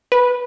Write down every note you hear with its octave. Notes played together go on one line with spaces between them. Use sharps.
B4